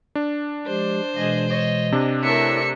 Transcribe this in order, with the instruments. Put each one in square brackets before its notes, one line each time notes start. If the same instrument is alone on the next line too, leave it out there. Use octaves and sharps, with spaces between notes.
[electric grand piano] D4
[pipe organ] F3 G#3 G4 [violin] C5
[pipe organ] B2 E3 G#3 [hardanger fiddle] G#4 D#5
[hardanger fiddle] C#5 D#5
[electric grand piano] C3 D4
[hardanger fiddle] A3 A#4 [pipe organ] E4 C#5 [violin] E5 C#7